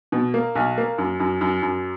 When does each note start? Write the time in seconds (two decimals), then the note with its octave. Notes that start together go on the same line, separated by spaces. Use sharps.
0.12 B2
0.34 A#3
0.55 B1
0.78 A#3
0.98 F#2
1.20 F#2
1.41 F#2
1.62 F#2